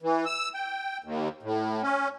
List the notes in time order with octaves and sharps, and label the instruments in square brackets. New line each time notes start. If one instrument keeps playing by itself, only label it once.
[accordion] E3
E6
G5
D#2
A2
C#4